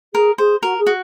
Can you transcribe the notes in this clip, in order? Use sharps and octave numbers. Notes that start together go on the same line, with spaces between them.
G#4 A#4
G#4 C5
F#4 A#4
G#4
F#4